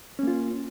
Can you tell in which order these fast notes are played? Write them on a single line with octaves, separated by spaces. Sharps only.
C#4 A#3 F4